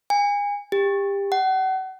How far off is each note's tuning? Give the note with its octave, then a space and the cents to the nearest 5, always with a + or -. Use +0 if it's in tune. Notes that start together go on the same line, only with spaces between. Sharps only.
G#5 -30
G4 +25
F#5 +35